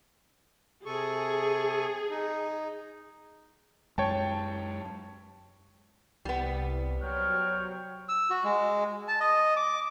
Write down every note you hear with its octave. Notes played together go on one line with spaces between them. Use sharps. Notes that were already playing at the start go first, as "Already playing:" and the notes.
C3 G#4 A4 C#6
D#4
F#2 G#3 C#5 G5 A5
C2 G3 B3
F#3 C5 C#5 G5 F6
E6
F#4
G#3
A5
D#5
D6